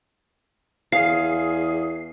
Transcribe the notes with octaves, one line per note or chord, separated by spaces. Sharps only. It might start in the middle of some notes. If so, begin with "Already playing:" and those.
E2 G#4 F5 C7